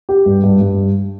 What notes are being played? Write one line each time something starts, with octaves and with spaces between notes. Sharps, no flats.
G4
G2
G2
G2